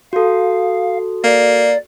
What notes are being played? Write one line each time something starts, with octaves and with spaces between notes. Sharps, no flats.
F#4 A4 F5
A#3 D5